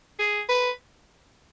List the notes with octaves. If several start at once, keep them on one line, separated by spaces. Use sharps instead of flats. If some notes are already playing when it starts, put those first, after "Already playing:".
G#4
B4